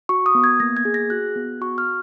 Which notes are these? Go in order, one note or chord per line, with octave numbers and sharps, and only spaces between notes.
F#4 C#6
D#6
B3
G#6
A#3 A#6
G#6
G#4
A#6
F#4 F#6
B3
F#4 C#6
F6